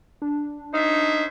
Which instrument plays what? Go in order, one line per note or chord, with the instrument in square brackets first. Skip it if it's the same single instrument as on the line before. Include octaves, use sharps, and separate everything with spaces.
[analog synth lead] D4
[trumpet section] C#4 C5 E5 [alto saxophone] D#4